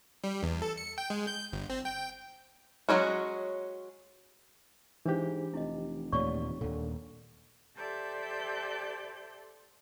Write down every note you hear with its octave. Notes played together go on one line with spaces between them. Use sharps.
G3
E2
A4
C#7
G5
G#3
G6
G1
C4
G5
F#3 G#3 C#4 F#4
G#2 E3 D4 G4 C5
F1 E4 D#5
D#2 A#2 A3 C#5 D5 C#6
D#2 A#2 D3
G4 A4 C5 D5 E5 G6